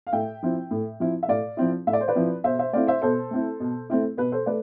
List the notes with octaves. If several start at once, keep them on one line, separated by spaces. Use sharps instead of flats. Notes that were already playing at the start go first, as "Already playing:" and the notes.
F5
A2 E5 G5
F3 C4 E4
A2
F3 C4 E4
E5
A2 D5 F5
F3 C4 E4
A2 E5
D5
C5
B4 D5
F3 C4 E4
B2 C5 E5
C5 E5
A3 C4 E4 D5 F5
C5 E5
B2 A4 C5
A3 C4 E4
B2
A3 C4 E4
B2 B4
A4 C5
A3 B4 D5